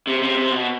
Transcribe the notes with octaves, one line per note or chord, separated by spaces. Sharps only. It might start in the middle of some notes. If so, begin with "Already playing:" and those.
C3
C3
C3
B2